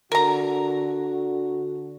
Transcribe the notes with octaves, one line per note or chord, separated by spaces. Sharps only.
D3 F#4 A#4 A#5